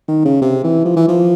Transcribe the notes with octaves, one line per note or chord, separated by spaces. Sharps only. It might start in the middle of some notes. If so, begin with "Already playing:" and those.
D#3
C#3
C3
E3
F3
E3
F3